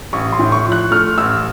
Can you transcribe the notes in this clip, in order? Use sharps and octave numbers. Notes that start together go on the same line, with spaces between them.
A1 C#6
C6
A2
C#6
F3
F#6
A3 F6
A1 E6